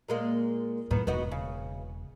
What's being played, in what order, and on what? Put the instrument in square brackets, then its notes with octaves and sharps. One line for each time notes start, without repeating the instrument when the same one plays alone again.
[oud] A#2 G#3 A#3
[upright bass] F#2 A2 [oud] D#3 B3
[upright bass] E1 [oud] B3 D#4 F#4
[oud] C#3